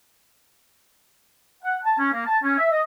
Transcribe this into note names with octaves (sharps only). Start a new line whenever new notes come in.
F#5
A5
C#4
A#3
A5
C#4
E5
D#5